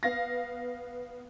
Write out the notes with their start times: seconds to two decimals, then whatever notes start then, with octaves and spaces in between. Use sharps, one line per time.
0.03 B3 F5 A#6